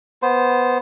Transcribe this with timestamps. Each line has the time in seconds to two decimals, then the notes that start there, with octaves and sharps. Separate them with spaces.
0.22 B3 C5